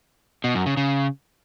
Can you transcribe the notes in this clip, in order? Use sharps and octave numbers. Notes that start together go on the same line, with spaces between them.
B2
F#2
C#3
C#3